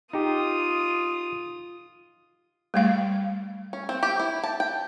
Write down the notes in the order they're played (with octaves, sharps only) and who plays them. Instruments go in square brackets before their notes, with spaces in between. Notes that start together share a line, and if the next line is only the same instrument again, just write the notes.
[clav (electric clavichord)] D#4 G4 [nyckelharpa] F4 D#6
[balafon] G3 A3 F5
[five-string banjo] C#4
C4
G4
E4
A5
G5